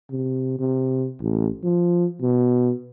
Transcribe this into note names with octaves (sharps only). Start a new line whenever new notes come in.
C3
C3
A1
F3
B2